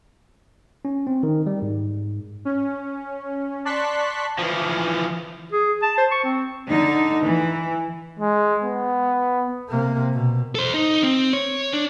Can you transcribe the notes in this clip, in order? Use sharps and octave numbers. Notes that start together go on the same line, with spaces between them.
C#4
C4
D#3
G3
G#2
C#4
D5 A5 C6 C#6 F#6 B6
E3 F3
G#4
A5
C5
C#6
C4
D3 D#4
E3
G#3
B3
C3 A#3
B2
A4 C5
D#4
C4
C#5
D4